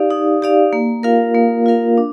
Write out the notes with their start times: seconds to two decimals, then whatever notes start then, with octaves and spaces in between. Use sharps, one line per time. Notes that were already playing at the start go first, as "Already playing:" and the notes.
Already playing: D#4 G4 D5 F5
0.11 D#4
0.42 G4 D5 F5
0.73 A#3
1.03 F4 A#4 F5
1.35 A#3
1.66 F4 A#4 F5
1.98 D4